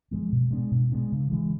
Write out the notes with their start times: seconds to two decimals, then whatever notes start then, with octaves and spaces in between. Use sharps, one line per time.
0.11 F3 G#3 B3
0.32 B2
0.51 G#3 B3 D4
0.71 B2
0.92 G#3 B3 D4
1.12 C#3
1.31 E3 G#3